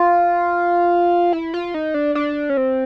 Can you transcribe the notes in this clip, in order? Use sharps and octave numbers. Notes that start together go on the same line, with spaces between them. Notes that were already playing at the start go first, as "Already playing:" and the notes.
Already playing: F4
E4
F4
D#4
D4
D4
C#4
C4